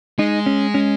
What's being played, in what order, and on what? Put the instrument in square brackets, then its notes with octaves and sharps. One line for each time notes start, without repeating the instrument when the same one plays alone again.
[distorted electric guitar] G#3 [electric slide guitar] D#4
[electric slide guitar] C#4
C#4